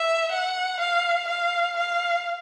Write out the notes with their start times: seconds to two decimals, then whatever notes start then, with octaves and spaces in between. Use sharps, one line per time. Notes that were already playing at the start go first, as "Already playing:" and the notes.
Already playing: E5
0.32 F#5
0.80 F5
1.28 F5
1.76 F5